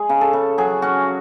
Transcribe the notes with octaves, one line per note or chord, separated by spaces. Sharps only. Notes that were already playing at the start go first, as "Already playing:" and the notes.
Already playing: G#3 G#4
C#3
A4
C#3
F#3 G#4
C#4 F#4